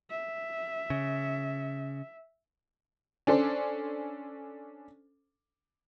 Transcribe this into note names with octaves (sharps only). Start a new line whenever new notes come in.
E5
C#3
C#4 D4 A4 C5